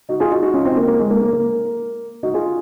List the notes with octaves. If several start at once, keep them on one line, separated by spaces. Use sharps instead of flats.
D#4 F#4
F4 G#4
D#4 F#4
D#4 F#4
C#4 F4
C4 D#4
A#3
A#3
G#3
A#3
A#3
A#3
D#4 F#4
F4 G#4